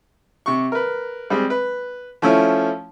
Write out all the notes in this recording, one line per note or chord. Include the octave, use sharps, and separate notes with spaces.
C3 C#6
A#4 B4
G3 G#3 C4
B4
F3 A3 C#4 E4